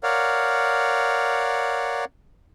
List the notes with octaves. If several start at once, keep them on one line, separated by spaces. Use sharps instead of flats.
A#4 C#5 D5 F5 F#5